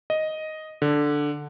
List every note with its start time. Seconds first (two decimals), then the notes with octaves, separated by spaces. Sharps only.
0.10 D#5
0.82 D3